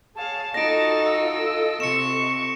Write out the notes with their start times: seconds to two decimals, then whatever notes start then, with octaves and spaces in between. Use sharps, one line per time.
0.16 G#4 C#5 F5 A5
0.54 D#4 F4 F#4 A4 D#5 A#6 D7
1.05 E6
1.80 C3 C#6 C#7 E7